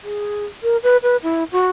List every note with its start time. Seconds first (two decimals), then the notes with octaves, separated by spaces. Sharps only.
0.03 G#4
0.62 A#4
0.83 B4
1.02 B4
1.23 E4
1.52 F#4